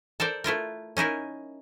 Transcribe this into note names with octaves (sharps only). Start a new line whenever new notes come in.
A4 A#4 C5 D5
A3 E4 F4 A#4
C#4 D#4 E4 A#4